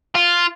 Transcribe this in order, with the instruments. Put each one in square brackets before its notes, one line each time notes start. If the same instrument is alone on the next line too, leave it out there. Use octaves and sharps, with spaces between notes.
[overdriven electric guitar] F4